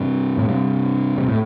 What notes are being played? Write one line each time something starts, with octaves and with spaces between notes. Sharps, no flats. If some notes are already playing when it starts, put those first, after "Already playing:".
Already playing: G2 C3
A2
G2 C3
C3
A2